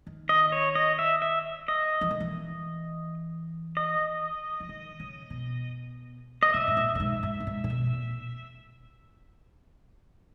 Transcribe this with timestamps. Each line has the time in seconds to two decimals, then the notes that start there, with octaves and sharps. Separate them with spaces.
0.07 D#3
0.29 D#5
0.52 C#5
0.75 D#5
0.99 E5
1.22 E5
1.68 D#5
2.01 E3
2.11 D#3
2.20 E3
3.77 D#5
4.60 E3
4.69 D#3
5.00 C#3
5.30 B2
6.43 D#5
6.53 C#3 E5
6.67 G#2
6.77 A#2
6.95 A#2
7.00 G#2
7.23 G#2
7.40 A#2
7.47 G#2
7.64 A#2
7.70 B2
7.93 A#2